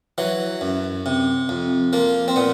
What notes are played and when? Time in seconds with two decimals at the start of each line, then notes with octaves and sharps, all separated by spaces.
0.18 E3 F#3
0.61 F#2
1.06 C3
1.49 F2
1.93 F3 A#3
2.28 C4
2.36 A#2 B3